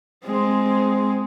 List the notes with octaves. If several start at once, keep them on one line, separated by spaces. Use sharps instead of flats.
G#3 C4